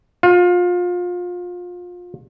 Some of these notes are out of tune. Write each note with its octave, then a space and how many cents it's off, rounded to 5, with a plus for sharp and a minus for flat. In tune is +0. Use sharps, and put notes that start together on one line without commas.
F4 +25